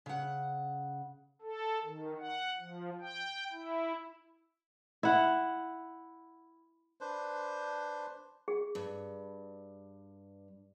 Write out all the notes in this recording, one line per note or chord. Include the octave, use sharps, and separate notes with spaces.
C#3 F#5
A4
D#3
F#5
F3
G5
E4
E4 F#5
D4 B4 C5
G#4
G2